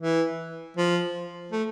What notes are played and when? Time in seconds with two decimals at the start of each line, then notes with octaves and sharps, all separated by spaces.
0.01 E3
0.77 F3
1.52 A3